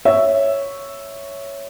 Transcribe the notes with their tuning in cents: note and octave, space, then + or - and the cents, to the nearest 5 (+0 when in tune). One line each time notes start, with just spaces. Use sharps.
C#5 +0 E5 +0